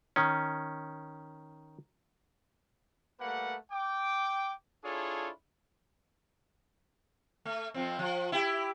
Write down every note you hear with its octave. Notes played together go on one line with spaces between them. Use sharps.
D#3 C#4
G3 A3 A#3 B4 F#5
G5 D6
D4 E4 F4 G#4 A4 C#5
A3
F2 F3 C4
F3
E4 G4